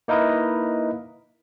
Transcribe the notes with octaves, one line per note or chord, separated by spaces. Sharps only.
A#3 D#4 E4 A#4 B4 D#5